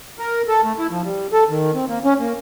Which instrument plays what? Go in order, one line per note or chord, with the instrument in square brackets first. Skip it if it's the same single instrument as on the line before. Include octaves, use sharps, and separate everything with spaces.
[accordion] A#4
A4
A3
E4
F3
G3
A4
D#3
C4
A#3
C#4
A#3